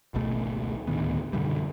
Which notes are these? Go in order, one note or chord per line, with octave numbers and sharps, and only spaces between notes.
G#1 C#2 B2 A3
D2 A2 D#3 B3
F#2 B2 D3 G3